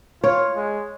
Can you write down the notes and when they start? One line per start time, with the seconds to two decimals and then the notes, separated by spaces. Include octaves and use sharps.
0.24 F4 C#5
0.56 G#3